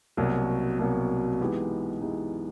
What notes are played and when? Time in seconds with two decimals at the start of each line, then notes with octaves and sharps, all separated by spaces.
0.17 C2 B2 F#3 A#3
0.79 C2 B2 F#3 A#3
1.41 E3 G#3 B3 D#4 G4
2.01 E3 G#3 B3 D#4 G4